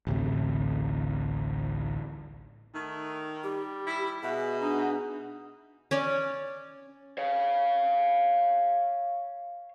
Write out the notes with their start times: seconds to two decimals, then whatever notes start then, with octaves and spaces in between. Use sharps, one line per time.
0.07 A1 D2 A2 C3
2.74 D#3 A3
3.44 G3 G4
3.86 E4
4.23 B2 G#4 E5
4.61 D4 D#4
5.91 C#4 C#5 D5
7.18 C#5 F5